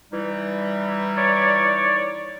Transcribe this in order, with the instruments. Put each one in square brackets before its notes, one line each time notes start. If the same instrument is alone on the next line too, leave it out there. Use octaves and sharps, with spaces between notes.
[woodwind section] E3 G3 D#4
[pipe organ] C#5 D5